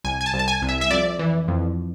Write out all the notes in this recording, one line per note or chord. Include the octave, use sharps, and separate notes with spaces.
C2 G#5
G#5
A5
C2
A5
G#5
C2
E5
E5
F2 D5
E3
F2